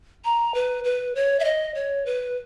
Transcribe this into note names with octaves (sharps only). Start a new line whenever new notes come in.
A#5
B4
B4
C#5
E5
D#5
C#5
B4